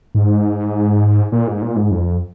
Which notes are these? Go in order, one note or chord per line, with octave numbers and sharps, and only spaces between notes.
G#2
A#2
G#2
A#2
G#2
F2